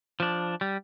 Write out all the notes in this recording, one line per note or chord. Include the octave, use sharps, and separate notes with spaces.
F3 D4
G3